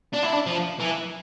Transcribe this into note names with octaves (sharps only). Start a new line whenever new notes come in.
D4
E4
D4
F3
E3